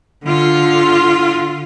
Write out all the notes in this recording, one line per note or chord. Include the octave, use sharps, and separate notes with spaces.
D3 F4